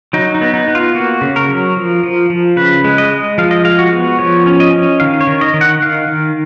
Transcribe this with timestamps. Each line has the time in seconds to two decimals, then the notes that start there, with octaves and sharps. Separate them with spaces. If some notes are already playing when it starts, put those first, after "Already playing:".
0.13 F#3 D#4
0.35 D#4
0.41 B3
0.54 D#4
0.68 B3
0.75 F4
0.95 A#3 F#4
1.21 C#3
1.36 A#4
1.49 F#3
1.77 F3
2.03 F3
2.30 F3
2.57 C#3 B4
2.84 G#3
2.98 D#5
3.12 G#3
3.38 F3 F5
3.51 D#5
3.65 G#3 F5
3.79 F#4
3.92 B3
4.19 F3 C#5
4.46 C#4
4.60 D#5
4.73 C#4
5.00 D#3 F5
5.21 C#5
5.27 D#3
5.41 D#5
5.54 D#3
5.61 F#5
5.82 D#3 F5
6.08 D#3